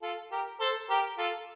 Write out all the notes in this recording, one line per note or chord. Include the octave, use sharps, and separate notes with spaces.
F4 A4
G4 A#4
A4 C5
G4 A#4
F4 A4